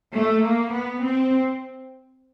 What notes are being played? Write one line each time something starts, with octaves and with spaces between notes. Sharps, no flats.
A3
A#3
B3
C4